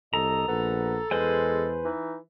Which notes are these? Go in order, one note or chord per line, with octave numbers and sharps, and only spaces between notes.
C2 A4 D#5 A#5
A#1 B3 A4
E2 G#3 B4 C5 G#5
E3 D#4